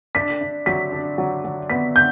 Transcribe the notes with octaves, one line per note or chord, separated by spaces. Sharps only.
D4 B6
D4
F#3 B6
D4
F#3
F#3
B3 B6
D4 G6